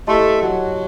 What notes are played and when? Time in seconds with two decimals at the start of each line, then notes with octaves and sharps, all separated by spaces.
0.07 A3 E4 G4 D#5 A5 C6
0.41 F#3